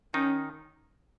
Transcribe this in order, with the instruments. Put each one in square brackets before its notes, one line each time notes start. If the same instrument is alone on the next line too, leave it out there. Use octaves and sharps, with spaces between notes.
[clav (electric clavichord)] D#3 D#4 [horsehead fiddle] C#4